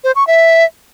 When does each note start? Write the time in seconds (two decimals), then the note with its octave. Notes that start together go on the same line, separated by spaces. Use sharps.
0.04 C5
0.16 C#6
0.27 E5